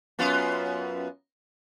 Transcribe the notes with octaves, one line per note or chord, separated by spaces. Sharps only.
F#2 B3 F4